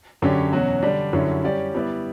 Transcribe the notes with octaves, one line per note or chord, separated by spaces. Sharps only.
F#2 D3 F#3 C#4 G4
E2 B2 F#3 C#4 F#4
D3 G3 D4
F#2 D3 G3 C#4 E4
G3 C#4 G4 D5
G3 B3 E4 B4 D5